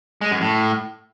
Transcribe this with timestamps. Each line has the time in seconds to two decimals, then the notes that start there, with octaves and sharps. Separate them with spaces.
0.21 G#3
0.31 F#2
0.41 A2